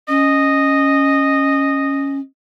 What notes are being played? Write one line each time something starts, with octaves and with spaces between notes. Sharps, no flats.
C#4 D#5